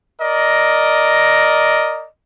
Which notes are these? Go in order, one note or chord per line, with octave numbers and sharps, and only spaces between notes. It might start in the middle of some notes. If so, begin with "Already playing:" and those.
A#4 D5 D#5